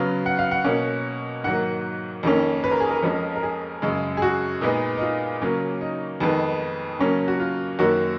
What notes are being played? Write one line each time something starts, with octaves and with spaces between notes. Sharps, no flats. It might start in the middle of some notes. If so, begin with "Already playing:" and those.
Already playing: C#3 F#3 B3 F5
F#5
F5
F#5
B2 A#3 C#4
G#2 D#3 F#3 A#3 F#5
F2 D#3 A#3 C#4
B4
A#4
G#4
A#4
F2 F3 G#3 C#4
A#4
G#4
F#2 C#3 G#3
G#4
F#4
A#2 G#3 B3 D#4
D#4
F4
C#3 F#3 A#3 C#4
D#4
F2 D#3 G#3 B3
C#3 F#3 A#3 C#4
F#4
F4
F#2 D#3 A#3 C#4 F#4